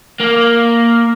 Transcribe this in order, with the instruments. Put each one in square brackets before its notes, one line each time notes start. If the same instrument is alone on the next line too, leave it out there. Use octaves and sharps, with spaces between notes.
[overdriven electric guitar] A#3